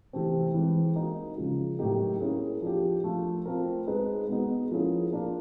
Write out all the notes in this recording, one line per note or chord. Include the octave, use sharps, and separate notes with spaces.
C3 E3 A3 C4
E3 G#3 C4
A#3 D#4 F#4
C#3 F3 G#3
A2 F#3 A#3 D#4 G4
A#3 C#4 E4 G#4
F3 A#3 D4 G4
F3 A3 D4 F4
A3 C4 F4 A#4
G#3 C4 D#4 G#4 B4
G#3 B3 D#4 F#4
F3 A#3 C#4 E4 G#4
A#3 D4 F4